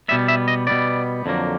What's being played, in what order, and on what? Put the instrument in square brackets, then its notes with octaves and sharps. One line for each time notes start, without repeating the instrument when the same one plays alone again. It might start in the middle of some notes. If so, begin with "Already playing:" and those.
[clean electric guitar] B2 G3 B3 E5
E5
D#5
B2 G3 B3 D5
F2 D3 F#3 A#3